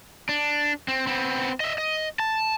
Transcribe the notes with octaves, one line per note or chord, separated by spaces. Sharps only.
D4
C4
B3 C4
D#5 E5
D#5
A5